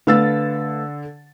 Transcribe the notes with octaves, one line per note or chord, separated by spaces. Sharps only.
D3 A3 B4 F5 E6 A6